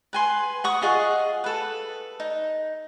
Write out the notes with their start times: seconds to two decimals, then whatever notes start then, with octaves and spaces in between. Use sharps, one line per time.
0.13 B4 G#5 C6
0.64 F#5 C#6 D#6
0.82 F4 G#4 D#5 F#5
1.44 A4 B4
2.20 D#4